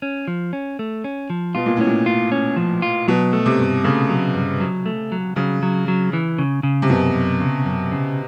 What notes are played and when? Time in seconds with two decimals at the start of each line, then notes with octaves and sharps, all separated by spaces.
0.02 C#4
0.28 F3
0.53 C#4
0.79 A3
1.04 C#4
1.30 F3
1.55 B2 F4
1.66 A#2
1.77 A2 C#4
1.87 A#2
2.06 F4
2.32 C#4
2.57 F3
2.82 F4
3.08 B2 F#3
3.33 A3
3.46 C3
3.58 G2
3.84 C#3 A3
4.10 F#3
4.35 G2
4.60 F#3
4.86 A3
5.12 F#3
5.36 C#3 F#3
5.63 F#3
5.88 F#3
6.13 E3
6.38 C#3
6.63 C#3
6.82 C3
6.90 F#2 B2
7.14 F#2
7.40 C#3
7.65 F#2
7.92 C#3